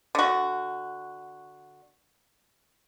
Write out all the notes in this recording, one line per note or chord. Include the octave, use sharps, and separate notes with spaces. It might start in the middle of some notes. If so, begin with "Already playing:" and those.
D3 F#4